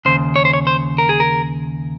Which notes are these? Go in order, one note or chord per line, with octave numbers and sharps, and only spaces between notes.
D#2 C#3 C5
C#5
C5
C#5
C5
A#4
G#4
A#4